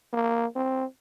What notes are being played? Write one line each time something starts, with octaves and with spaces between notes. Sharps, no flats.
A#3
C4